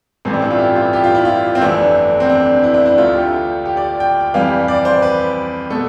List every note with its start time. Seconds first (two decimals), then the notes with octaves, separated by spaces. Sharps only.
0.25 A1 G2 E3 A3 C4
0.33 D4
0.42 E4
0.51 F4
0.59 G4
0.75 F4
0.93 G4
1.04 F4
1.15 E4
1.25 F4
1.55 C4
1.61 G1 F2 E3 A3 D4
2.20 C4
2.30 D4
2.64 E4
2.74 D4
2.86 E4
2.98 D2 D3 A3 F4
3.15 G4
3.66 G4
3.77 D5
4.00 G5
4.34 F2 E3 G3 F5
4.68 D5
4.85 C5
5.02 B4
5.70 B2 A3 A4